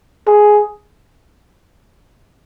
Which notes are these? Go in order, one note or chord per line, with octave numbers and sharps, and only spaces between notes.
G#4